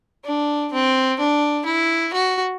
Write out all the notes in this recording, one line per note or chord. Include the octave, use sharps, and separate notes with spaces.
D4
C4
D4
E4
F#4